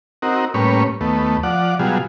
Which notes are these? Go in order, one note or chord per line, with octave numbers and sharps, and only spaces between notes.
C4 D#4 F#4 A#4
A2 G3 A#3 C#4 B4 C#5
D#2 A3 B3
F3 D5 F#5
B2 F#3 G3 F4 G#4